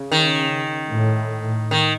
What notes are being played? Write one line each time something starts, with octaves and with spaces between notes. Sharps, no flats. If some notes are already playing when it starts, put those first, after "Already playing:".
Already playing: C#3
D#3
A2
D#3